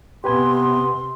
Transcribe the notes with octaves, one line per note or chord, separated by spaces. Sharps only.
C3 B3 G4 B4 G#5 C6